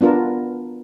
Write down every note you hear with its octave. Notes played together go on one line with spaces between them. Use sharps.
B3 D4 F4 A#4 A5